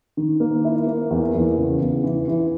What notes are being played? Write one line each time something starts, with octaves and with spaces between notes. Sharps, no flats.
D#3
A#3
E4
A#3
E2
E2
C#3
E2
E3
E3